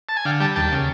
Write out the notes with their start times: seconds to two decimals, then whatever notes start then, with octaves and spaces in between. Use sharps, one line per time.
0.09 A5
0.17 G#5
0.25 D3 F5 G5
0.40 G3 G5 A5
0.56 D#2 G5 A5
0.72 C#3